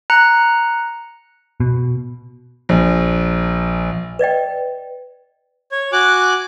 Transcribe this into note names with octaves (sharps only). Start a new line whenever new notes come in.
A#5 F#6 C#7
B2
A#1
B4 D5 D#5 G5
C#5
F#4 G#5 D6 F#6